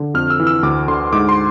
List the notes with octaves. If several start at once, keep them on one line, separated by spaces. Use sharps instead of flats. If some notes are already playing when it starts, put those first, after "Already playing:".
Already playing: D3
F2 F6
E6
E3
E6
D2 D6
D3 C6
G#2 D6
C6